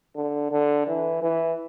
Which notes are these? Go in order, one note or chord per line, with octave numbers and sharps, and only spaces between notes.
D3
D3
E3
E3